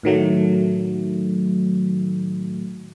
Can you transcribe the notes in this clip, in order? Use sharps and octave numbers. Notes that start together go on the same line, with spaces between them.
A2 D#3 F#3 A3